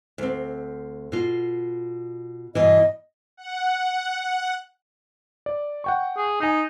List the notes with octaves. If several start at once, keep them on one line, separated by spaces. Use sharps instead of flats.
D2 C4
B2 F4
G2 B2 E3 D#5
F#5
D5
F#5 G5 C#6
G#4
D#4 G#5 D#6